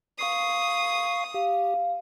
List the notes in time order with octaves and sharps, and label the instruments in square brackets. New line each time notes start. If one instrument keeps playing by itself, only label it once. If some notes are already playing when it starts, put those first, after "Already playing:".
[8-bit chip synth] F5 C#6 C7 [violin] D#6
[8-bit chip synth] G4 [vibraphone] F5